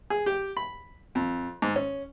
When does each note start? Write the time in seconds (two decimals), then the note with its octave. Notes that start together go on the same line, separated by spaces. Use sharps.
0.10 G#4
0.26 G4
0.57 B5
1.15 F2
1.62 G#2
1.76 C#4